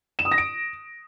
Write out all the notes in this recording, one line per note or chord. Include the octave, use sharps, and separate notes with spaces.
E7
D#6
A#6
D7